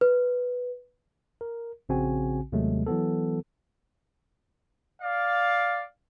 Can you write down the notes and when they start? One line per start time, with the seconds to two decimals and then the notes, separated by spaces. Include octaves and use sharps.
0.01 B4
1.41 A#4
1.89 A#1 C#3 C4 F#4 G#5
2.52 D#2 C3 F#3 G#3 A3
2.86 E3 F#3 B3 A4
5.02 D5 F5